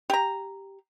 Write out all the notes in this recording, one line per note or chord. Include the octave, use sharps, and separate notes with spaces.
G4 A#5